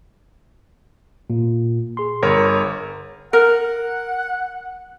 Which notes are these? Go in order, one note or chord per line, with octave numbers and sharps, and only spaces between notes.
A#2
G#4 C6
G1 A#4 C#5
A#4 F#5